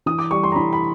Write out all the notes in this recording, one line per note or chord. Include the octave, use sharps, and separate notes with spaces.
E3 D#6
D6
G3 C#6
C6
A#5
E3 B5
B5